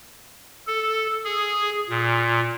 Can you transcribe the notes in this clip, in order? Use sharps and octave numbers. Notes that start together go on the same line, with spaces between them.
A4
G#4
A#2